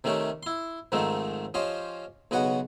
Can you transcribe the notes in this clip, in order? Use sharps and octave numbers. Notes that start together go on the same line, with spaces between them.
C3 D#3 A3 C#4 G4
E4 C6
G#2 D#3 F3 A3 C4 D#4
F3 C#4 G4 C5 D#5
B1 C#3 B3 F#4 D#5 F#5